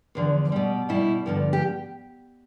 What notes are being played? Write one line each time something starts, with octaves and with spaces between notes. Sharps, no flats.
E2 D3 F3
B2 G3
B2 G3 E4
G2 D3 F3
G4